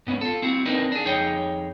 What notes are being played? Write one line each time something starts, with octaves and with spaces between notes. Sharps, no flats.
G#2 B3 C#4
F4 A4
C4 E4 F#4
C4 D4 D#4 A#4 B4
D4 G#4
F2 D#4 G#4 C#5 G5